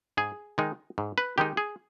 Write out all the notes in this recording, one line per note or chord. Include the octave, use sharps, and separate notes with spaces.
G#2 G#4
D#3 G#3 D#4
G#2
B4
D#3 G#3 D#4 G4
G#4